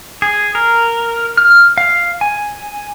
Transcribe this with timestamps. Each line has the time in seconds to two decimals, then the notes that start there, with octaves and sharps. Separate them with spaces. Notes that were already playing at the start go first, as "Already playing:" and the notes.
0.22 G#4
0.55 A#4
1.37 F6
1.78 F5
2.21 G#5